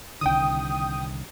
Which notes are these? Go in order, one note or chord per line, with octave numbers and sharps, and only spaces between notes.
C2 D3 D#3 G5 D#6